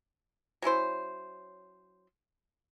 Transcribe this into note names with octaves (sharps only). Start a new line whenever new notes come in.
F#3 C#4 E4 C5